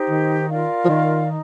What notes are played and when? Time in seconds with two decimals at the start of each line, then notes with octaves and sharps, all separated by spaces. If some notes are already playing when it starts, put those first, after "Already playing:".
Already playing: D#4 G4 C5
0.09 D#3
0.49 F4 A#4 D5 F5
0.85 F3
0.89 D#3
1.28 D#4